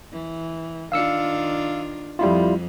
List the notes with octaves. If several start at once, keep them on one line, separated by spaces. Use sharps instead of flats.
E3
D#3 D4 F4 F5 E6 C#7
F2 F3 G3 E4 F4